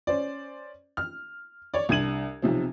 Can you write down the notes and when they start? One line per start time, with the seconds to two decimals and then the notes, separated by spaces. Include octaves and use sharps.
0.07 C#4 C5 D5
0.97 F6
1.74 C#5 D5
1.89 C2 D4 G#6 D#7 F#7
2.42 B1 C3 F3